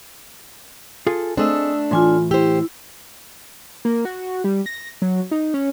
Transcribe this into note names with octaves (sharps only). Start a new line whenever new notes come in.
F4 G#4 A4
A3 C4 D4 G#4 D#5 D#6 E6
A2 E3 F4 G#5 C6
E4 G4 C5
A#3
F#4
G3
A#6
F#3
D#4
C#4